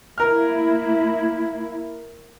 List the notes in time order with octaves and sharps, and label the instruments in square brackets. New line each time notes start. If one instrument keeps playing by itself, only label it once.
[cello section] A#3 E4 [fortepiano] A#4 F6